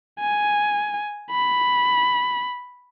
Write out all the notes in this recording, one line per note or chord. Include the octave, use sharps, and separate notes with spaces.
G#5
B5